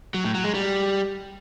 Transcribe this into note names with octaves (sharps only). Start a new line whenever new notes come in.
F#3
A2
F#3
G#3
G3